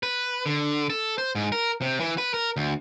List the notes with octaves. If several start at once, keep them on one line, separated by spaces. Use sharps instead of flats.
B4
D3
A4
C5
G#2
A#4
C3
E3
B4
A#4
D2